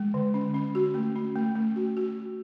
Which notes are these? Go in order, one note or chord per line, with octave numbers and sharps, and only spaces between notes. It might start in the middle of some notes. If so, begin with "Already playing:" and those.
Already playing: G#3
D3
C#4
C#4
F#4
A3
C#4
A3
A3
F#4
F#4